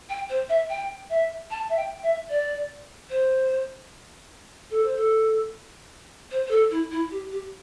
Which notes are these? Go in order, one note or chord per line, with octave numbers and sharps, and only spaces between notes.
G5
C5
E5
G5
E5
A5
E5
G5
E5
D5
C5
A4
C5
A4
C5
C5
A4
E4
E4
G4
G4